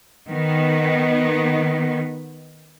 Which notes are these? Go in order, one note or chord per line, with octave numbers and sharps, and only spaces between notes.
D#3 B3